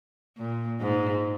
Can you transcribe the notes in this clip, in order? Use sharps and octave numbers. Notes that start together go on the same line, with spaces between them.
A#2
G#2